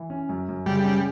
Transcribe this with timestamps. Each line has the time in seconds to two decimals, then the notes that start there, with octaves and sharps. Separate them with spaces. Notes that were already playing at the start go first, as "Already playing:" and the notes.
Already playing: E3
0.10 C#4
0.29 F#2
0.48 F#2
0.66 C#3 G3
0.85 C#4